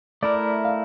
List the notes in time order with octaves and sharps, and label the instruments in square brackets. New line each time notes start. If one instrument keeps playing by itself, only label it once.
[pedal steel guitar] A3 E4 A#4 [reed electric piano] D5
[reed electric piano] F5